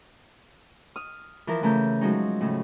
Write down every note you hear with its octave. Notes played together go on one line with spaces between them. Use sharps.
D#6 F6
E3 F3 A#4
C#3 E3 A3 A#5 G6
F3 F#3 G#3 C#4 D#4
A2 C#3